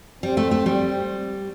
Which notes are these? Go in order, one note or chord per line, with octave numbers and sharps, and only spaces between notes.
G3 C4
A3
A3
G3